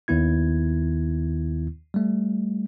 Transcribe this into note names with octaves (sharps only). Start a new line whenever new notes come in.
D#2 D#3 B3 E4 G#6
G3 A3